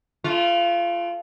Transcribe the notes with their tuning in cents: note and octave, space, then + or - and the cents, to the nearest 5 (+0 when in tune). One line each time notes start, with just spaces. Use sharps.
A3 -35 F4 -20